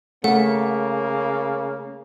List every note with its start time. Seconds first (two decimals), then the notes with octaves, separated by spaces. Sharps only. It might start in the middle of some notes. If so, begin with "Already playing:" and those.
0.24 C#3 A3 A#3 F#5